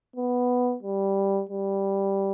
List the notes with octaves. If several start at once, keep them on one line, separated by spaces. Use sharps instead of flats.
B3
G3
G3